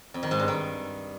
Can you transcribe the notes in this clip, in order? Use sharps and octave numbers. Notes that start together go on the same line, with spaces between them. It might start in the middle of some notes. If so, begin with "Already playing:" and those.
F2
D#3
G#2
G2
D#3